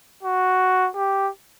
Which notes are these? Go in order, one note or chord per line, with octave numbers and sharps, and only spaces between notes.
F#4
G4